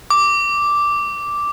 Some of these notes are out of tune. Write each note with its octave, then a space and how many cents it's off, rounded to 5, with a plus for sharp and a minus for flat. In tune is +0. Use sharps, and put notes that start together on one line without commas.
D6 -5